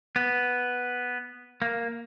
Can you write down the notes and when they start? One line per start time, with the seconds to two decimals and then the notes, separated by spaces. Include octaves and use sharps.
0.16 B3
1.62 A#3